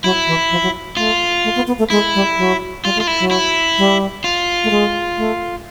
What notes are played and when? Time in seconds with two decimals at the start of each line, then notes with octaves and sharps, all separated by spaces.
0.04 F#3 E4
0.27 E3
0.51 F3
0.62 F#3
0.97 A3 F4
1.44 A3
1.56 B3
1.67 B3
1.78 A3
1.90 G#3 E4
2.14 G3
2.38 F#3
2.84 G3 F4
2.96 A3
3.00 F4
3.07 E4
3.19 F#3
3.31 E4
3.78 G3
4.24 F4
4.64 A3
4.70 G#3
5.18 A3